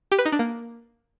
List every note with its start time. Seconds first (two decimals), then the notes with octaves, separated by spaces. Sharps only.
0.12 G4
0.18 B4
0.25 D#4
0.32 D4
0.39 A#3